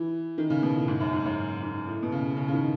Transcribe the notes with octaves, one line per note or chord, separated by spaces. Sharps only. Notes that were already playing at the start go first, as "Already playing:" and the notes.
Already playing: E3
D#3
C#3
B2
A2
G#2
F#2
G#2
F#2
G#2
A2
B2
C#3
C#3
C#3
D#3